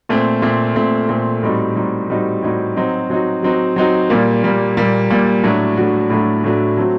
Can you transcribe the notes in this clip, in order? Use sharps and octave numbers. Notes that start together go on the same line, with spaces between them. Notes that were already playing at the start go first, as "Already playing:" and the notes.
A#2 A3 C4
A#2 A3 C4
A#2 A3 C4
A#2 A3 C4
A2 G3 C4 D#4 F#4
A2 G3 C4 D#4 F#4
A2 G3 C4 D#4 F#4
A2 G3 C4 D#4 F#4
F#3 C4 D#4 F#4
F#3 C4 D#4 F#4
F#3 C4 D#4 F#4
F#3 C4 D#4 F#4
A#2 G3 A#3
A#2 G3 A#3
A#2 G3 A#3
A#2 G3 A#3
A2 F#3 A3 D4 F#4
A2 F#3 A3 D4 F#4
A2 F#3 A3 D4 F#4
A2 F#3 A3 D4 F#4
F#3 A3 C4 F#4